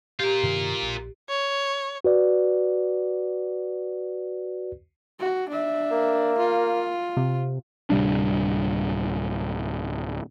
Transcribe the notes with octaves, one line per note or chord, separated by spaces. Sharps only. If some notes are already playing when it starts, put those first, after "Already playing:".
F4 G4 A#4
G2 C3 D#3
A#1
C#5
F#4 B4 D5
F#4
D4 E5
A#3
F4
C3
D1 C3 G3 D4